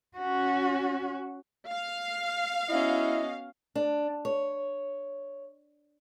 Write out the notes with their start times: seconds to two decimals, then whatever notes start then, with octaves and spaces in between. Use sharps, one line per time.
0.18 C#4 F#4
1.69 F5
2.69 B3 C#4 E4 F#4 D#5
3.75 D4
4.25 C#5